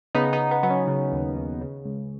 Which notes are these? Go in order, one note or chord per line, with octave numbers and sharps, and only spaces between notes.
C#3 B3 D#4
B3 D#4
C#3
B3
F#3 B3
C#4
C#3
D#2
D#2
C#3
C#2